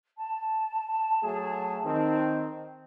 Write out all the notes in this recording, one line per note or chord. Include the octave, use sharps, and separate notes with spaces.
A5
F#3 A3 G#4
D#3 C4